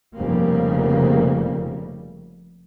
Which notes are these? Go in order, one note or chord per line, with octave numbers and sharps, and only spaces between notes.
F1 C#3 G3 A#3